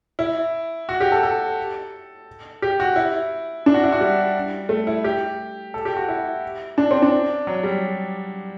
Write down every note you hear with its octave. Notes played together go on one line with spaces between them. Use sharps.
E4
F#4
G4
A4
A4
G4
F#4
E4
D4
F#4
E4
F#4
G3
A3
E4
G4
A4
G4
F#4
E4
D4
C4
D4
F#3
G3